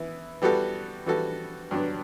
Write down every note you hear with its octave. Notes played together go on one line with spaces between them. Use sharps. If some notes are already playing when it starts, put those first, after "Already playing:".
Already playing: E3 B3 E4
E3 G3 B3 F#4 A4
E3 G3 B3 F#4 A4
G2 D3 F#3 B3 D4